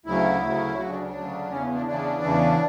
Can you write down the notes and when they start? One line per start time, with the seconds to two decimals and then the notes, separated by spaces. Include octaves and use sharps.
0.06 D2 C#3 F#3 E4
0.42 D2 C#3 F#3
0.78 D2 C#3 F#3 F#4
0.90 D4
1.02 D4
1.14 D2 C#3 F#3
1.50 E2 C#3 E3 C#4
1.62 B3
1.74 D4
1.86 E2 C#3 E3 D4
2.22 E2 C#3 E3